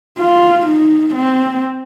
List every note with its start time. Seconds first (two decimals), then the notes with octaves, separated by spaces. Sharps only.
0.18 F4
0.67 D#4
1.15 C4